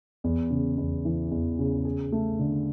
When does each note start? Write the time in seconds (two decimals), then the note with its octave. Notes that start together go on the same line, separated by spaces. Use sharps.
0.24 E2
0.51 C#3
0.78 E2
1.05 E3
1.31 E2
1.59 C#3
1.85 G#4
2.12 A3
2.39 D3